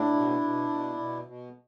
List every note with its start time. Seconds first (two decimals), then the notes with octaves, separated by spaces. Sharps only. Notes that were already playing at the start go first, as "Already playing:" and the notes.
Already playing: A2 D4 E4
0.13 B2
0.41 B2
0.69 B2
0.97 B2
1.25 B2